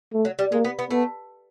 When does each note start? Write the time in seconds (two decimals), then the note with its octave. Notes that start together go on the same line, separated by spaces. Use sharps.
0.13 A3
0.25 F#3
0.39 G3
0.52 G#3 A#3
0.65 B3
0.79 B3
0.91 A3 B3